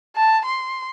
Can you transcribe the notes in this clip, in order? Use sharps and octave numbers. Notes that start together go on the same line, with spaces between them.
A5
C6